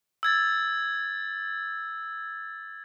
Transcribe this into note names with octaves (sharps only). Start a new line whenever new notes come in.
E6 G#6 A6